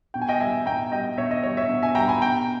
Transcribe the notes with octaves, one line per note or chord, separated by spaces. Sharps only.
B2 G5
G#5
D#5 G5
G3 E5 G#5
B2 G5 A#5
G3 D#5 G5
B2 C#5 E5
D#5
G3 C#5
C#5 E5
B2
E5 G#5
G3 G5 A#5
G#5 B5
B2 G5 A#5